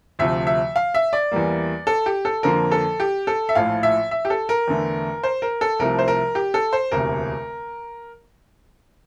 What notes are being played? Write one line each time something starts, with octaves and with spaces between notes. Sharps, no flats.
D2 C3 F3 A3 E5
E5
F5
E5
D5
E2 E3 G3 A#3
A4
G4
A4
F2 D3 F3 A#3 A#4
A4
G4
A4
E5
A#1 A2 F3 A3 F5
E5
E5
G4
A4
A#4
E2 D3 A3
C5
A#4
A4
C2 C3 F3 A3 A#4
C5
A#4
G4
A4
C5
E1 D2 C3 A#4